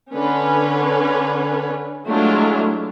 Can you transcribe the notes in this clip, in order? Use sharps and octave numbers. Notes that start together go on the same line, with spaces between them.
D3 C#4 B4
F#3 G#3 A3 D4 E4 F4